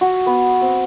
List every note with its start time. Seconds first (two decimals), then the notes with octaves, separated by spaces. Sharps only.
0.01 F#4
0.26 B3
0.61 C4